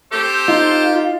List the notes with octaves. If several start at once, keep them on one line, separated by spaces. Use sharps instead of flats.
C4 G4 A4 C5
D#4 F4